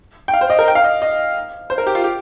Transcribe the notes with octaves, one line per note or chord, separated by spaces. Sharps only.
G5
F5
C5
D#5
A#4
G5
F5
D#5
D#5
C5
A#4
G4
F4
G4